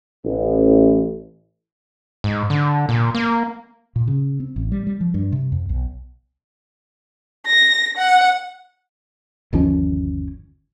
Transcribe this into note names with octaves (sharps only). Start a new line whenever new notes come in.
A1
G#2
D3
A#2
A#3
A#2
C#3
C4
A1
G3
G3
F3
G2
C3
F2
B1
A#6
F#5
G1 D#2 F3 C#4